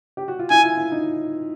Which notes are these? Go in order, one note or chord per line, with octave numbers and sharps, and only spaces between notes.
G4
F#4
F4
E4 G#5
F4
E4
D#4